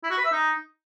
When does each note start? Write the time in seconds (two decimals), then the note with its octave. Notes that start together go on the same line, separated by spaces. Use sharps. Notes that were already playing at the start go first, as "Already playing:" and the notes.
0.03 E4
0.10 F#4
0.18 B4
0.25 E5
0.32 D#4